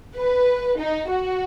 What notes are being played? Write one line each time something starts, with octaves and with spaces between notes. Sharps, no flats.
B4
D#4
F#4